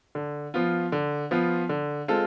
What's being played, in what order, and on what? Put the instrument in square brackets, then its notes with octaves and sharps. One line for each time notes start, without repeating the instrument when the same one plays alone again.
[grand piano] D3
F3 B3 F4
D3
F3 B3 F4
D3
G#3 C4 F4 A4